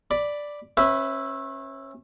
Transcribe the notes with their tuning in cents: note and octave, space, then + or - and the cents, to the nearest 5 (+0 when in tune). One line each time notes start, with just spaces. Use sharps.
D5 +0 B5 +0
C#4 -30 B4 +15 E5 -5